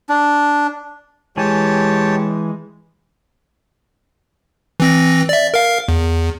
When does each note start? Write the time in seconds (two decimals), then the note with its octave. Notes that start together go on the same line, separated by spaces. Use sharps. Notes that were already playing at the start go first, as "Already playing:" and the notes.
0.09 D4
1.37 E3 G#3 G4 C#5 G#5 A5
4.80 E3 C4 A#6
5.29 D5 E5
5.54 A#4 F5
5.88 E2